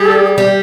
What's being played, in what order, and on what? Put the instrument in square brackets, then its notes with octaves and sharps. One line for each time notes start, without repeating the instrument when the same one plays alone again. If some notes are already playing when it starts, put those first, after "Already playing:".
Already playing: [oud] G3 [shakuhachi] G#4
[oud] G3 [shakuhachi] G4